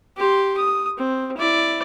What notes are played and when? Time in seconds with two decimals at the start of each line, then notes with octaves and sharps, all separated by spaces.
0.17 G4 C6
0.57 D#6
0.97 C4
1.37 E4 D5